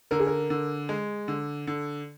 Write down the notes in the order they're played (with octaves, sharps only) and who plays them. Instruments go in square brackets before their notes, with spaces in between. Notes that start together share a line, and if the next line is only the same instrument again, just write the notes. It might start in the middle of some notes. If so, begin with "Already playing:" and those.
[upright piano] D3 [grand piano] A#4
[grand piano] G#4
A#4
[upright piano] D3
G#3
D3
D3